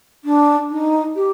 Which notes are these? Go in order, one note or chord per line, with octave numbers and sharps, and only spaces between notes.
D4
D#4
G4